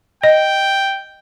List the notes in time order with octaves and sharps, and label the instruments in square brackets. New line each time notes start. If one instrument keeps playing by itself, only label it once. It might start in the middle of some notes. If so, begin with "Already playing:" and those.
[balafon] D#5 [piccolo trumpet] G5